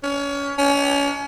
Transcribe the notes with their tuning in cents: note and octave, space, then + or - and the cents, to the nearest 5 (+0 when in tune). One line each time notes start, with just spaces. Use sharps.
C#4 +25
C#4 +30